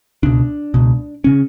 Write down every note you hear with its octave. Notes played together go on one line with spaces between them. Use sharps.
C#2 B2 D4
C#2 B2
C#3 C#4